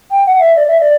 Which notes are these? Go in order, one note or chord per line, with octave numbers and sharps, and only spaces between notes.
G5
F#5
E5
D5
E5
D5